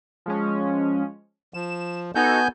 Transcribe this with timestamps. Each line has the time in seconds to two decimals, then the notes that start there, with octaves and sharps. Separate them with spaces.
0.26 F3 G#3 C#4
1.54 F3 E7
2.15 B3 D#4 F#4 A4 G#5 G6